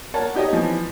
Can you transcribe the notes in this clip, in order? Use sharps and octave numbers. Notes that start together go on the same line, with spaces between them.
A#4 C#5 F#5 A5
D#4 G4 C#5 D#5
E3 F3